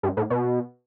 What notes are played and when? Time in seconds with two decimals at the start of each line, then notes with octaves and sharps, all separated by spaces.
0.03 G2
0.17 A2
0.30 B2